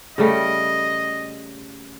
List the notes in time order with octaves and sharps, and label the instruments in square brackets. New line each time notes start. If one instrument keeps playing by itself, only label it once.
[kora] C#3 G3 A3 [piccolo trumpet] D#5